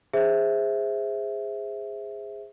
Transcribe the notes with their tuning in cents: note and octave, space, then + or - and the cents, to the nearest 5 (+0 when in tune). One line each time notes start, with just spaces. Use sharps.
G#4 -15 C5 +0 E5 +0